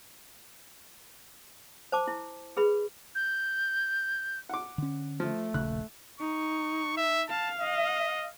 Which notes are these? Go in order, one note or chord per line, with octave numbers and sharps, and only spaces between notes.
C5 A5 D6
E4
G#4 B4 B5
G6
F#5 D6
D3 C#4
F3 A3
D#1 A#1 C#3 F#6
D#4 C#6
E5
F5 A5
D#5